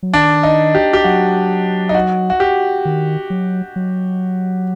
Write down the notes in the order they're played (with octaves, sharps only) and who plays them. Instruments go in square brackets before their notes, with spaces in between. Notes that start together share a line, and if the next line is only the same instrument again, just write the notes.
[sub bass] F#3
[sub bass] D#3 [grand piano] D4
[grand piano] D#4
G4
G4
[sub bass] F#3 [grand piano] F#4
[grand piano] D#4
F#4
F#4
G4
[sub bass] D#3
F#3
F#3